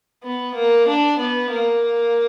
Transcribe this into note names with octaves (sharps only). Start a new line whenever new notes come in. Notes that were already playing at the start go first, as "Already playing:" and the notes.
B3
A#3
D4
B3
A#3